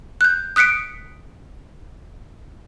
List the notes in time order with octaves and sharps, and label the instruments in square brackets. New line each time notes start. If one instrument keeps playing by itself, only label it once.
[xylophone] F#6 G6
D#6 F#6 B6 C#7 D7